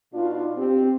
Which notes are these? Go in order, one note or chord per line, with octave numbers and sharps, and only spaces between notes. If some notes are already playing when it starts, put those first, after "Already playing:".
B2 D4 D#4 F4
C4 G4